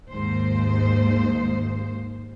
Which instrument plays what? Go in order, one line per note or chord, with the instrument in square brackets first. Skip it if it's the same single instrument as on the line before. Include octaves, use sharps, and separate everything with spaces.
[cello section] D#2 G#2 C5